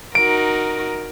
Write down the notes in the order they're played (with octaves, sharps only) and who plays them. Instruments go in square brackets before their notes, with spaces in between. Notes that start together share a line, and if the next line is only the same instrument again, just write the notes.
[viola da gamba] D#4 F#4 A#4 [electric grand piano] D7